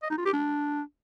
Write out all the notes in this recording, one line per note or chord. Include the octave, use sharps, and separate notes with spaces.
D#5
D#4
F4
G4
D4